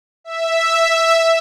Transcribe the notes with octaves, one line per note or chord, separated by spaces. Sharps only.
E5